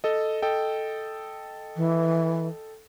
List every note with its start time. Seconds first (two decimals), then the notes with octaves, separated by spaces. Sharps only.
0.04 A4 D#5
0.42 A4 D#5 G5
1.76 E3